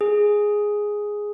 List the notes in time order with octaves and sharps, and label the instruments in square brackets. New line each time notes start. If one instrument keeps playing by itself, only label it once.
[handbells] G#4